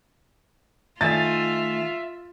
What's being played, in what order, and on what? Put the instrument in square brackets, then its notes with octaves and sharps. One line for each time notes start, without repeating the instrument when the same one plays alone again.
[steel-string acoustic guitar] D#3 A3 G#5 [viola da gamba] F4 [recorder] E5 [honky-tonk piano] A6